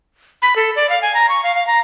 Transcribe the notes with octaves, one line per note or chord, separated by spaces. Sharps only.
B5
A4
D5
F5
G#5
A#5
C#6
F5
F5
A#5